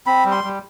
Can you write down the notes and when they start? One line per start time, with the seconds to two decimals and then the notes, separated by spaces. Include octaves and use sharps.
0.06 C4 B5
0.25 G3
0.31 C6
0.44 G3